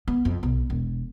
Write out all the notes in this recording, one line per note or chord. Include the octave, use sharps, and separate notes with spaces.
B3
F2
B1
E1